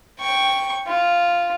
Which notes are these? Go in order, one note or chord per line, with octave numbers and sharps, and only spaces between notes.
G5 C#6
F4